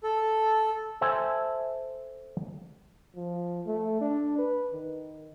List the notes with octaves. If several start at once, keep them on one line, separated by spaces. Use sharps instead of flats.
A4
A4 C5 E5 G#5
F3
A3
D4
B4
D#3